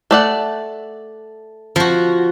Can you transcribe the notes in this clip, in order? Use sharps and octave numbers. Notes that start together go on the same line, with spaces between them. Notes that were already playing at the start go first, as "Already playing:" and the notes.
A3 D5 F#5
F3 F#4